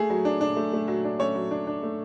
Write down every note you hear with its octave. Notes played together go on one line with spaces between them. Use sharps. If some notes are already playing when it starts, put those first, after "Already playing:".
Already playing: A3 G#4
F#3
D4
D4
A3
A3
F#3
D4
A3 C#4 C#5
F#3
D4
D4
A3